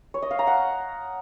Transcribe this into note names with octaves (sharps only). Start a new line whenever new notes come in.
C#5
D#5
F5
A#5
F#5